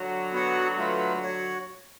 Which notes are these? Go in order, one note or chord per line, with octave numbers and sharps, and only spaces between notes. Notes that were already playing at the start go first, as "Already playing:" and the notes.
Already playing: D3 F#3
B3 F#4 C#5 F#5
A3 F4 B4
F#4 C#5 F#5